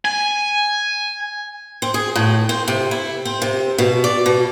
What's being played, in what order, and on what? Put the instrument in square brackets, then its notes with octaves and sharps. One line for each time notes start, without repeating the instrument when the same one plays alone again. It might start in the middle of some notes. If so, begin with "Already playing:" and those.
[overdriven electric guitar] G#5
[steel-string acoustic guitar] C4
G#4
A2
C4
C3
E4
C4
C3
B2
D5
B2